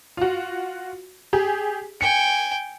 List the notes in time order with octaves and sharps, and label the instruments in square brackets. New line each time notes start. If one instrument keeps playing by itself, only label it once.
[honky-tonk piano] F4 F#4
G4 G#4
[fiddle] G5 G#5 [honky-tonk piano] C#7